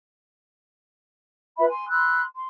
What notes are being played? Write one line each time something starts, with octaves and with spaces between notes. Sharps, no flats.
F4 B4 E5 B5
G#5 C6
B5 C6 E6 F#6
C6